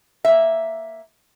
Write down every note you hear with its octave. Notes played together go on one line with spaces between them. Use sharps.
A#3 E5